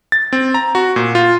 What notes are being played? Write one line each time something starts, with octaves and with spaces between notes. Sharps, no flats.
A6
C4
A#5
F#4
A#2
F4